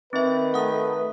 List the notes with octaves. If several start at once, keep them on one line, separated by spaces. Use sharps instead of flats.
D#3 C4 B4 E5
A3 F#5 D#6